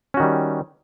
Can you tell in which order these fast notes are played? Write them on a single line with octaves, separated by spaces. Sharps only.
C#4 F#4 D#3 G3